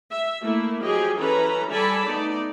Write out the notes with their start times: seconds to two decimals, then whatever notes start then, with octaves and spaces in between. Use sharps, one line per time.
0.12 E5
0.42 A3 A#3 E4
0.82 F3 F#3 G4 G#4 D#5
1.17 E3 C#4 A4 B4 A#5
1.71 G3 A4 D5 G#5 A5 B5
2.06 A3 B3 D#4 D5